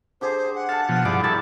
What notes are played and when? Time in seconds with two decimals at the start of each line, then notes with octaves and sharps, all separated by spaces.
0.21 D3 G4 G#4 C5
0.55 F#5
0.69 A4 F5 A5
0.89 B2 F3
1.05 G2 F3 B3 E4 G#4 D5
1.24 E4 G4 A4 A#4 C#5 A5